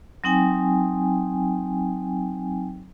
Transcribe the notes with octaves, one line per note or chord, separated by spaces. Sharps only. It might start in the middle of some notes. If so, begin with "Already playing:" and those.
F#3 C4 D#4 G5 G#5